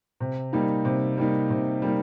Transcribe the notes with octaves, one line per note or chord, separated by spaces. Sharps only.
C3
G3 A#3 D#4
C3
G3 A#3 D#4
C3
G3 A#3 D#4